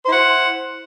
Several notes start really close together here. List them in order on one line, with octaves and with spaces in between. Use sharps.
C5 E4 F#5